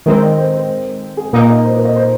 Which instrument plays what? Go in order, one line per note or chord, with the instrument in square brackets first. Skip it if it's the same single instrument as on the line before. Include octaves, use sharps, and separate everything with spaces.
[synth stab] D#3 G#3 C4 [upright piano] A#4
[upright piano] D#5
C5
C5
G#4
[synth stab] A#2 A#3 D#4 [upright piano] A#4
[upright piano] D#5
C5
A#4
D#5
C5